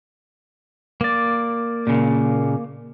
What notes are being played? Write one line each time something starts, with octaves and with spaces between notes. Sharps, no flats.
A#3 D5
A#2 C#3